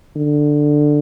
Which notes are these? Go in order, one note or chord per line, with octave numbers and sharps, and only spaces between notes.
D3